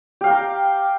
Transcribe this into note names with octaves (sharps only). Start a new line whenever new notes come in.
G4 F5 G5 A#5